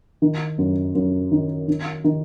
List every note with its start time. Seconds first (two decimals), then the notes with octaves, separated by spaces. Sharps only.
0.22 D#3
0.58 F#2
0.95 F#2
1.31 D#3
1.68 D#3
2.04 D#3